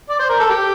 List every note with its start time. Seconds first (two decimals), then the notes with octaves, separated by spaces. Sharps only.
0.09 D5
0.19 C5
0.30 A#4
0.40 A4
0.50 G4